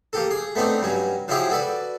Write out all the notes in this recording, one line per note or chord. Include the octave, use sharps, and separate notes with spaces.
A#3 G4 A4
G#4
A3 B3 C4 D4 D#4
G2 F#3 C#4
F3 F#3 C#4 E4 G4 G#4
F#4 A4 B4 D5